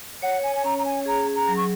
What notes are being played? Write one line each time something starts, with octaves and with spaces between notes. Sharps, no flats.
C#5 F#5
G#5
G#5
C#4 A#5
A#5
G#5
G#4 A#5
A#5
F#3
C#6